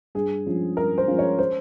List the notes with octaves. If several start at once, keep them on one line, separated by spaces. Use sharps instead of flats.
G2 G#4
F3 G#3 C#4 F4
G2 A#4
C5
F3 G#3 C#4 F4
C#5
C5